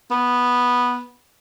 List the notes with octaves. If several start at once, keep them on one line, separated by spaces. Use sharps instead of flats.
B3